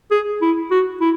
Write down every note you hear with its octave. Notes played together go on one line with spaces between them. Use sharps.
G#4
E4
F#4
E4